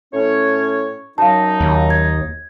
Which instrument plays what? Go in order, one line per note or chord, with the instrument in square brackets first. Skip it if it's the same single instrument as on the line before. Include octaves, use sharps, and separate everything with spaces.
[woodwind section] A2 C#4 C#5
[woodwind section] F#2 F#3 D#4 [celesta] F5 A5
[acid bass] D#2
[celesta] G#6